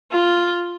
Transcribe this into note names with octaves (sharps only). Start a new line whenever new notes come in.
F4